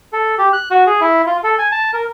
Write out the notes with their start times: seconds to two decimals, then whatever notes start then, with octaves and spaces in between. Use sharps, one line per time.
0.13 A4
0.38 G4
0.53 F#6
0.71 F#4
0.87 G#4
1.01 E4
1.26 F4
1.44 A4
1.58 G#5
1.72 A5
1.93 A#4